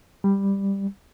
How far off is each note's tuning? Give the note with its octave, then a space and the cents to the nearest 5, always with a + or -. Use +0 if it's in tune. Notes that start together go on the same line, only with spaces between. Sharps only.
G3 +10